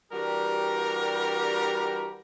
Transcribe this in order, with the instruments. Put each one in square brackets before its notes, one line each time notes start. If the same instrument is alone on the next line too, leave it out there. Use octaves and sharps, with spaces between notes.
[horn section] E3 G3 D4 F#4 G4 A#4